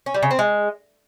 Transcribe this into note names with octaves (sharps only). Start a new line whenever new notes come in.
C#4
G3
C#3
C4
G#3